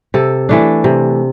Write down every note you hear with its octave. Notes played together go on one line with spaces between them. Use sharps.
C3 A4
E3 A3 D4
C3